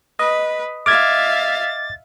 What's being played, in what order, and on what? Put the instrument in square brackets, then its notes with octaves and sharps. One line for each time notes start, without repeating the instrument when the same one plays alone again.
[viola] B4 [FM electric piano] D#5
[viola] E5 F5 [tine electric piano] D6 F6 G#6 [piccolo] A6